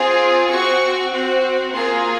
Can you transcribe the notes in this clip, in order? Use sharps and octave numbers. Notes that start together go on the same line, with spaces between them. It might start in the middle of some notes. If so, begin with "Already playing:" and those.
Already playing: C4 F4 G#4
C4 F#4 C#6
C4 F#4
A#3 F4 G#4 C6